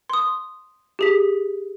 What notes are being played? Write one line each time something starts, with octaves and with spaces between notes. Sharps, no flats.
C6 D#6
G4 G#4 B6